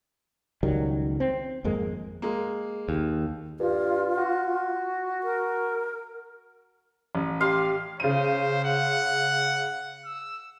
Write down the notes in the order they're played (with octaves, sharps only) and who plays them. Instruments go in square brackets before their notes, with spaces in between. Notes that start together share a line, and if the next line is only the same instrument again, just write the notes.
[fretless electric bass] C#2 D#3 F#3 G3
C4
G#1 F2 G#3 A#3
[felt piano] G#3 A#3
[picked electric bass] D#2
[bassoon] G2 [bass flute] F4
[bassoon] F#4
[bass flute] A#4
[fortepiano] A1
[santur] G4 F5 C6
[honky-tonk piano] C#3 D#7 [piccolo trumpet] C5
[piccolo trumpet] F#5
E6